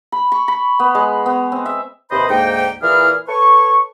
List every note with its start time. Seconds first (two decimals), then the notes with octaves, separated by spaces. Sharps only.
0.12 B5
0.32 C#6
0.48 B5
0.79 B3
0.95 G#3
1.26 B3
1.52 C4
1.66 E5
2.11 D#2 C3 B4 C5 D#5 B5
2.29 D2 G#2 A#3 D#4 G5
2.82 A#2 E3 E4 G#4 F6
3.27 A4 B4 C#5 C#6